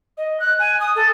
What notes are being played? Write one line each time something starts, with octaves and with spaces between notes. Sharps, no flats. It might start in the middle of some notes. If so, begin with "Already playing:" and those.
D#5
F#6
G#5
D#6
A4